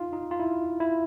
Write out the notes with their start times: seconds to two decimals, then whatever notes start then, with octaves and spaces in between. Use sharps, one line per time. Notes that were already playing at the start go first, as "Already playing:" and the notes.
Already playing: D#4 F4
0.13 D#4
0.31 F4
0.40 E4
0.80 E4